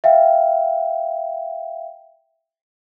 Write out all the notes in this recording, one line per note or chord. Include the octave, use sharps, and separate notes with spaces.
E5 F5 G5